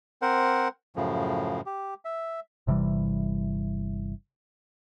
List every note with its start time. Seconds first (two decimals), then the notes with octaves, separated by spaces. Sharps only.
0.22 C4 A#4 C5 F#5
0.96 F#2 A2 C#3 F3
1.66 G4
2.05 E5
2.67 G1 C3 E3 G3